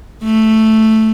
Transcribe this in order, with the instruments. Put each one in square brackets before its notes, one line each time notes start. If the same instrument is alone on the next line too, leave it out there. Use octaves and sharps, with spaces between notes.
[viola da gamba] A3